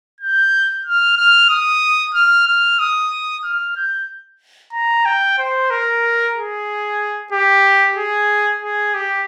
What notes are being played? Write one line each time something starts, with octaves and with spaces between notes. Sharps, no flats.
G6
F6
F6
D#6
F6
F6
D#6
F6
G6
A#5
G5
C5
A#4
G#4
G4
G#4
G#4
G4